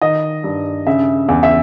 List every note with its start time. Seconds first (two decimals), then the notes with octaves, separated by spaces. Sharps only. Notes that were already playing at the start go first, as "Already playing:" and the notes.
0.02 D#3 D#5
0.44 G2
0.87 C#3 E5
1.29 E2
1.43 E5